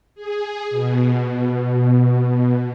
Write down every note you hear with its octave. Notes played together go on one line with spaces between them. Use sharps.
G#4
B2